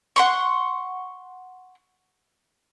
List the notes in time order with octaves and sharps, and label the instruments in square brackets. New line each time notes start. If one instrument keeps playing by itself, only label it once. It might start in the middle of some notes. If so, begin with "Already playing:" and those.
[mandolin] F#5 C6 C#6